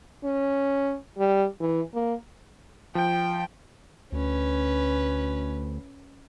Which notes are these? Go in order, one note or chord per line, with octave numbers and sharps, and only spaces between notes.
C#4
G3
E3
A#3
F3 G5
D2 C#4 B4